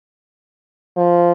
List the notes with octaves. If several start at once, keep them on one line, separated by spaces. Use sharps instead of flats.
F3